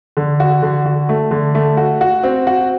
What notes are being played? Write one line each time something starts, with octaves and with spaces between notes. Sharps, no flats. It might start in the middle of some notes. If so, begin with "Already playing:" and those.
D3
F#4
D3
F#4
A3
D3
A3
F#4
F#4
C4
F#4